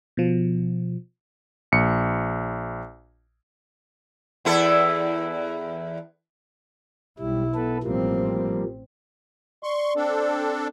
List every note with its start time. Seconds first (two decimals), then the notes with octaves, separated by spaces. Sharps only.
0.17 B2 F3
1.72 A#1 C#7
4.45 E2 E4 A4
7.19 B1 G3 E4
7.55 B3 A4 B4
7.84 A1 F3 G3 A#3 C4
9.63 D5 C6 C#6
9.96 C4 D4 A4